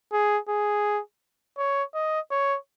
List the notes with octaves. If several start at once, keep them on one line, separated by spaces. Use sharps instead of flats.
G#4
G#4
C#5
D#5
C#5